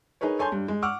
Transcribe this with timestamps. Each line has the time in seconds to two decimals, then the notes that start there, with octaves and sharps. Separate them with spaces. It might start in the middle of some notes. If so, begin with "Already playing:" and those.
0.21 D#4 G#4 A#4 B4 C#5
0.39 A4 C#5 G#5 A5 C6 G6
0.52 G2
0.68 G#3
0.82 F#5 C#6 D6 E6 F6